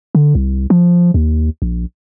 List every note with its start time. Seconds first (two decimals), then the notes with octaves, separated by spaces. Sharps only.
0.15 D3
0.35 C2
0.70 F3
1.14 D#2
1.62 A#1